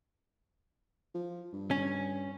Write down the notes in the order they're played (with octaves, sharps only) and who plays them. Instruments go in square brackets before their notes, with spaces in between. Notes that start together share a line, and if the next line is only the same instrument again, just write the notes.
[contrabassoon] F3
G2
[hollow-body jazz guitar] C#4